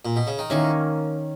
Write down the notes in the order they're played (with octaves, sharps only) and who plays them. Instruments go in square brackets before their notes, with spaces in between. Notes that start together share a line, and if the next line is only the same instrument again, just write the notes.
[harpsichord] A#2
B2
C#3
D#3
[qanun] D#3 A#3 C#4 [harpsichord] E3